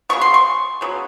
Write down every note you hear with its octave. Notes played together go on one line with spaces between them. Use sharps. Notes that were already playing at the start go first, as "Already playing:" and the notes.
C#3 F#3 B3 C#6
C6
C#6
C#3 F#3 B3